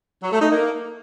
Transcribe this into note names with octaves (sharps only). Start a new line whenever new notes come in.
F#3
A3
D#4
A#3